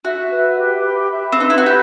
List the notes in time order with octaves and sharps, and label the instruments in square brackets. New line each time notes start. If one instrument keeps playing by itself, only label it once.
[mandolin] F#4 [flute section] E5
[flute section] B4
G4
B5
E5
[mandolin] C4
[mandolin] D#4 [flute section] B4
[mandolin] E4
F#4
[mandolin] G4 [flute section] B5